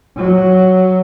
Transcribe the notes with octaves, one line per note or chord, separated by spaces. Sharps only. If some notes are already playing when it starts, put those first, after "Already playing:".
F#3